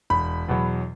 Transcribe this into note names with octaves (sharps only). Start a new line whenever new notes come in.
E1 B5
E2 B2 F#3